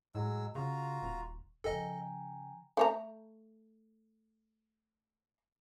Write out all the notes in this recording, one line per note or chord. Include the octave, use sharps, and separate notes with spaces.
A2 F#3 G#3 E6
C#3 F4 F#4 A#5
D#1
C#3 F3 A4 D#5 G5 G#5 A#5
A3 C#5 A#5